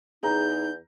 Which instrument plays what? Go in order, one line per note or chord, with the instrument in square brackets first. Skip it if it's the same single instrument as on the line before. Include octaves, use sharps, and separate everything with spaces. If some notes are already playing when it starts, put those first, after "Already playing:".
[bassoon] E2 [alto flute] D#4 [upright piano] G#4 A#5 [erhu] G6